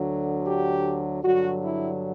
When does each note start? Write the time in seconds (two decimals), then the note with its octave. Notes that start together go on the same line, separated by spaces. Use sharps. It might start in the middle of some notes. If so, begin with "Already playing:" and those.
Already playing: D2 D3 F#3
0.46 G4
1.22 G2 D3 F#3 F#4
1.62 E4